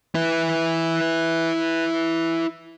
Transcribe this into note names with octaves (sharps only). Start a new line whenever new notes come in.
E4 B4